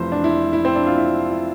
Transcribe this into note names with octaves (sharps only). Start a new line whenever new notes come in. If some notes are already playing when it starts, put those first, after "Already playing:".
Already playing: F1 F2 E3 C5
D4
E4
E4
C4
D4
F4
E4
E4